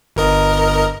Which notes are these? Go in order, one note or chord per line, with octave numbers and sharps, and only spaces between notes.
G1 A#4 D#5